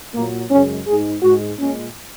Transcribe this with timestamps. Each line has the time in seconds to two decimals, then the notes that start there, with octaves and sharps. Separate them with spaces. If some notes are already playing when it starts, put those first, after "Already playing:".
0.15 A#2 F#3 A#3
0.50 F#2 C#3 G#3 C#4
0.86 G#2 G#3 G#4
1.22 G#2 G#3 F#4
1.58 A#2 G#3 C#4